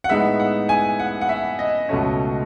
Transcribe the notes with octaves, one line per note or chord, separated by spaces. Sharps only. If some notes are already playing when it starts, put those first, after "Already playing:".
F#5
A2 G#3 B3 D#4 E5
F#5
G#5
F#5
F#5
E5
D#5
C#2 B2 A3 C#4